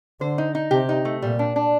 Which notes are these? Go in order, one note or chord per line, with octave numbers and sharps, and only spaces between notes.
D3 C5
D#4
D#4
C3 G4
D#4
A3
A#2 G3
D4
D4